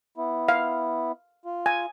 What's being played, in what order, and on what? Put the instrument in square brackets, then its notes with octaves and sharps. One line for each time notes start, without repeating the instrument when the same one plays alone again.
[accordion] B3 E4
[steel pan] F5
[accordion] F4
[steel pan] G#5